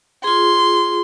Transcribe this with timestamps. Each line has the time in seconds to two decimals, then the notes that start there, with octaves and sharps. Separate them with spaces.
0.24 F4 G#4 C6